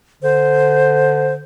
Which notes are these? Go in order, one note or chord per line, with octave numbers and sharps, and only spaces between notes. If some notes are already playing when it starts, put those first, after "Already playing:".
D3 C5